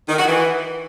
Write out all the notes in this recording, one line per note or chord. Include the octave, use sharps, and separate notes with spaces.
D#3
F#4
E3